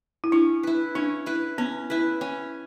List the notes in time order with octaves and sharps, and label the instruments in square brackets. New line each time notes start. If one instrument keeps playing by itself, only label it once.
[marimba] E4
[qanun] C#4 [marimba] D4
[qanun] E4 B4
[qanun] C#4 [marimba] D4
[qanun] E4 B4
[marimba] B3 [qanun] C#4
[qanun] E4 B4
C#4